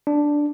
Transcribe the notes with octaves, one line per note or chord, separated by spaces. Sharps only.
D4